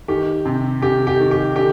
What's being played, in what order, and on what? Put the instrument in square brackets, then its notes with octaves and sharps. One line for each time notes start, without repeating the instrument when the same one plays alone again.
[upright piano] D#3 G4
C3
C3 G4
G4
D#3
G4
D3 G4